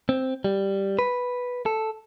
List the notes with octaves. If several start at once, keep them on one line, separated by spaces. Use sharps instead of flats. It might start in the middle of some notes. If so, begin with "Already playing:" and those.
C4
G3
B4
A4